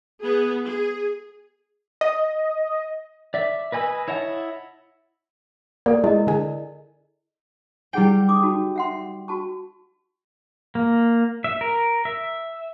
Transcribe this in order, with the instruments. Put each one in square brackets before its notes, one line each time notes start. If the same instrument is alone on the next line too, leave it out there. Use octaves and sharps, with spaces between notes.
[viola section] B3 G#4
G#4
[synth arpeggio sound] D#5
[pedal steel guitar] D5 E5
B4 D#5 G#5 B5 E6
E4 C#5 D#5 F#5 A5
[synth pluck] A#3 [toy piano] A4 D5
[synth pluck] G#3 [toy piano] E4 A#4 D#5
[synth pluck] D3 G#4
[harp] G3 G5 [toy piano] E4 G#4 F#5
[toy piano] G4 D6 D#6
D#4 F#4 A5
E5 F#5 C6
F#4 A5 C#6
[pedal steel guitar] A#3
E5
A#4
E5